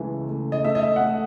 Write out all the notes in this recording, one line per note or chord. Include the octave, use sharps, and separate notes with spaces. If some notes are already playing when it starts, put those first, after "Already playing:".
Already playing: C#2 E3 A3
A3
D#5
A3 E5
D#5
E5
F#5
A3 E5